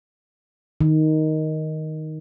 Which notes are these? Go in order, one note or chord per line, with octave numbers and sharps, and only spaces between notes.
D#3